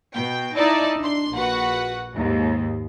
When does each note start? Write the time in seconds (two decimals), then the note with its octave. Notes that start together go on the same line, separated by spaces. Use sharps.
0.13 B2 G5
0.55 D#4 E4 D5 A5
0.99 D4 C6
1.35 A#1 F#4 B4 F#5
2.13 D#2 G#2